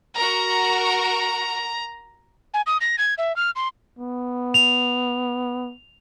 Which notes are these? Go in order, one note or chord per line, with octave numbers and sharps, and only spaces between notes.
F#4 A#4 A#5
G#5
D#6
A#6
G#6
E5
F6
C6
B3
F7